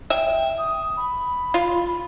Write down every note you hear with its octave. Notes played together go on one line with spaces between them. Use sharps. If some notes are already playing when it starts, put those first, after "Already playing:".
E5 G5
D#6
B5
F4